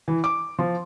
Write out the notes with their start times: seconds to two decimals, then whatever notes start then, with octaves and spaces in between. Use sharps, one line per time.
0.08 E3
0.24 D6
0.59 F3